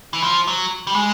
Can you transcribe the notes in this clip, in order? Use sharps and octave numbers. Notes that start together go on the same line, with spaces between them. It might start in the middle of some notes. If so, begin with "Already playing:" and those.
E3
F3
F#3
G3
G#3